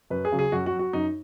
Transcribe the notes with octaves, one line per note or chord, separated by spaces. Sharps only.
F#2 B4
G#4
C#3 F#3
G#4
F#2 F#4
F#4
F#3
F#4
F#2 D#4